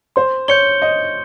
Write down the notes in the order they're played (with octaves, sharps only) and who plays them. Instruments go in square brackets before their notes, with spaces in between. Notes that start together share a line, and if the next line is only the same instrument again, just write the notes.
[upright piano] C5 [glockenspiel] C6
[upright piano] C#5 [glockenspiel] G6 C#7 G7
[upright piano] D#5 [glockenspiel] C6